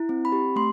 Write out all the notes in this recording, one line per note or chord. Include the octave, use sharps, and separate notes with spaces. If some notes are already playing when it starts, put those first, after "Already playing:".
Already playing: E4
C4
B5
G4
A3 C6